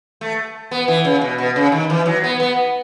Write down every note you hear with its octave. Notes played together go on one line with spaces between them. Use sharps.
A3
B3
E3
C#3
B2
B2
C#3
D#3
E3
F#3
B3
B3